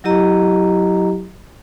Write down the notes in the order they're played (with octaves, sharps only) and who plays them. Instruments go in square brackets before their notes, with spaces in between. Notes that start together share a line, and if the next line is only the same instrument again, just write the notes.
[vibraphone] F#3 E4 G4 D#5 A#5